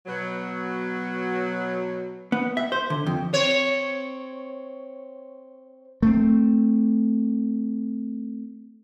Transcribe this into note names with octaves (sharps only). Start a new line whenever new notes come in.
B2 F#3
B3
E5
C5
D3
F2
C4 C#5
A3 C4